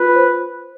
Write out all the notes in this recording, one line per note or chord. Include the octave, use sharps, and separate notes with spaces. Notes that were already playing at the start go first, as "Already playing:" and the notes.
Already playing: F4 B4
C5